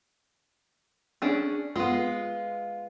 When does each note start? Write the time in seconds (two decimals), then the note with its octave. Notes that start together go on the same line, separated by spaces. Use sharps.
1.22 C#4 D4 G#4
1.76 G#3 B3 F4